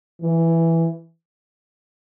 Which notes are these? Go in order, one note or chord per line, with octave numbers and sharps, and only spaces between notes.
E3